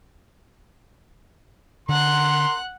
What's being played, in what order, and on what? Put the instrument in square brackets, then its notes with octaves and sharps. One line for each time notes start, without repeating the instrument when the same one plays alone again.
[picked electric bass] D3 [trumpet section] A#4 A#5 C6 [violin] F#5 F#6